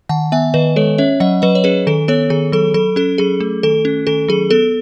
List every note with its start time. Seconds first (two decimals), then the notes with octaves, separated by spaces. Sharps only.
0.09 D#3 F#5 A5
0.32 B3 E5 G#5
0.54 D#3 B4 D#5
0.76 G#3 A4 C#5
0.98 C#4 C#5 E5
1.20 F#3 D#5 F#5
1.42 F#3 B4 D#5
1.55 C#5
1.64 C#4 G#4 B4
1.87 D#3 A4
2.08 B3 A4 C#5
2.30 D#3 G#4
2.52 F#3 A4
2.74 F#3 A4
2.96 C#4 A4
3.18 F#3 G#4
3.40 A3
3.63 D#3 A4
3.85 C#4
4.07 D#3 A4
4.28 F#3 G#4
4.50 B3 A4